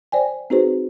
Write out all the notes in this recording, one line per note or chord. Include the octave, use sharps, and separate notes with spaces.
C5 D5 G5 G#5
C4 D#4 F#4 G#4 B4 C5